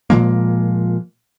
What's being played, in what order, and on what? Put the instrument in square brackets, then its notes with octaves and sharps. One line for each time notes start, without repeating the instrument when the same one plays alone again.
[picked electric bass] A#2 F3 G#3 A#3